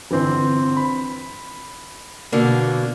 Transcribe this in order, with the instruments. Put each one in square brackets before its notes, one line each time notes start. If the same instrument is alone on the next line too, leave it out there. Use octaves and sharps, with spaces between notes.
[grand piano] G1 E3 C4
B5
[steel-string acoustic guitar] B2 D3 A#3